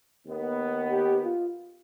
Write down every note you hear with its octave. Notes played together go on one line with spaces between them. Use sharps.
D#2 D#3 B3
G4
F4